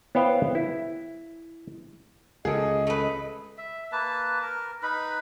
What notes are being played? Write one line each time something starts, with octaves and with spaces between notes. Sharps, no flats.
B3 E4 C5 C#5 F5 G5
E4
C#2 C#3 G#4 A4 D#5
A3 B4
E5
A#3 B4 A5
A#4
D#4 B4 B5